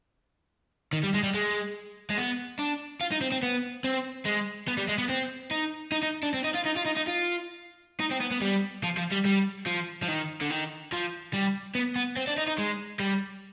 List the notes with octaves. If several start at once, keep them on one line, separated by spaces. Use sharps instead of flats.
D#3
G3
G#3
G3
G#3
G#3
B3
D4
F4
D#4
C4
C4
B3
C4
G#3
B3
G3
G#3
B3
C4
D#4
D#4
D#4
D4
C4
D#4
F4
D#4
F4
D#4
D#4
F4
D#4
C4
B3
B3
G3
F3
F3
G3
G3
F3
F3
D#3
D3
D#3
F3
G3
B3
B3
C4
D4
D#4
D#4
G#3
G3